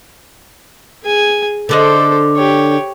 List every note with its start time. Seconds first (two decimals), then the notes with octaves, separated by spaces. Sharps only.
1.03 G#4 G#5
1.69 D3 D4 A4 C5 D#5
2.36 G4 C#5